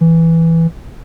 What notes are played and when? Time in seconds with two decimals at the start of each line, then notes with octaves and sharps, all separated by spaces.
0.01 E3